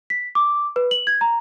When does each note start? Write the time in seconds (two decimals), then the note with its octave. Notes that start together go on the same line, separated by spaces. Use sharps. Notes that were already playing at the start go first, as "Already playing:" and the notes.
0.10 B6
0.35 D6
0.76 B4
0.91 F#7
1.07 G#6
1.21 A#5